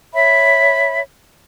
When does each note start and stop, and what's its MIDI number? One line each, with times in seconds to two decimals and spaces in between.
0.13 1.00 73
0.13 1.00 76
0.13 1.00 83